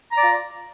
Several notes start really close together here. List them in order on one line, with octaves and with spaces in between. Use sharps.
A#5 D5 F4